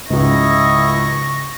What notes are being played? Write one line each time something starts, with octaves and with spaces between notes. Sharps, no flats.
C#2 G#2 C#3 E4 D#5 C#6 A#6